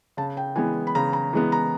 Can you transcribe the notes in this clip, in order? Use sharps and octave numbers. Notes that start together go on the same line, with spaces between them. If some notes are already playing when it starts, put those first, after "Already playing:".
C#3 A5
G5
E3 G#3 B3 G#5
B5
C#3 A#5
A#5
E3 G#3 B3
A#5